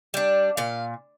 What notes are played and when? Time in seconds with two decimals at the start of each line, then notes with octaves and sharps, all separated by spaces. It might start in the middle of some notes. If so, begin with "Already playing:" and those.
0.14 G3 D4
0.57 A#2 F5